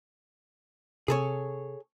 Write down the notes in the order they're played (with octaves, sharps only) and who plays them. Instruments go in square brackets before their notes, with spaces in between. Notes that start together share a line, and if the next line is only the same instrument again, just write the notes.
[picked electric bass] C3 [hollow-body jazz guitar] G#4 A4 C#5